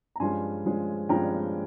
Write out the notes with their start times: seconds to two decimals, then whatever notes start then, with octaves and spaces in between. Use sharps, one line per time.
0.16 A#5
0.20 G2 F3 G#3 C#4 G#5 C6
0.65 G2 F3 G#3 C#4
1.09 G2 F3 G#3 C#4 G5 A#5